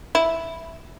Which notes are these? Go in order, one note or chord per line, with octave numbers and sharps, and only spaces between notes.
E4